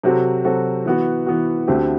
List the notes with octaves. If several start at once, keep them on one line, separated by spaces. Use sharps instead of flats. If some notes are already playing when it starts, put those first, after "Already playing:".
C3 F#3 C4 F#4 A4
C3 F#3 C4 F#4 A4
E3 B3 F#4
E3 B3 F#4
D2 D3 A3 C4 G4